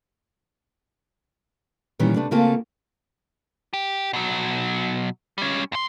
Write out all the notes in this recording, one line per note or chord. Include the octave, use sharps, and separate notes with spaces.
A#2 D#3 E3 G3 C#4
C3 A3 D4
C#3 A3 A#3 C4 F4 A4
G4
B2 F#3
G3 C#4
D#2 C6